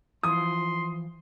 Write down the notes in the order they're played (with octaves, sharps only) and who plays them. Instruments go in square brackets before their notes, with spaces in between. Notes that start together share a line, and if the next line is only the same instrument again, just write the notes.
[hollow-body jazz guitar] E3 F3 F4 [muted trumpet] C6 [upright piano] D#6